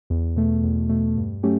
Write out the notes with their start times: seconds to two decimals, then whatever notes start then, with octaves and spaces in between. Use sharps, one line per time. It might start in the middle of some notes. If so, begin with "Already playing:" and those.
0.10 E2
0.36 B2 A3
0.63 E2
0.89 B2 A3
1.17 G2
1.43 F#3 A3 C#4 G4